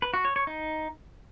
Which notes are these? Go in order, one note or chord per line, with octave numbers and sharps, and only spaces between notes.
B4
F#4
C#5
C#5
D#4